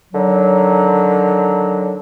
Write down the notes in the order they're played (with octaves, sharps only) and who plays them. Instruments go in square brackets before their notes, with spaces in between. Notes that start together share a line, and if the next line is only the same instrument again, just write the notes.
[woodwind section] D3 D#3 F#3